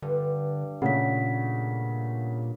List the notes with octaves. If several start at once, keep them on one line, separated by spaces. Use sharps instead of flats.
G2 D3
A#2 C#3 A3 F#5 B6